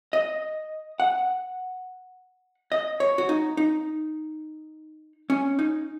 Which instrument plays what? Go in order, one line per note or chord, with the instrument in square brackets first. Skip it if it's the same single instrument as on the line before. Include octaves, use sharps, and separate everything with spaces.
[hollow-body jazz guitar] D#5
F#5
D#5
C#5
F#4
D#4
D#4
C#4
D#4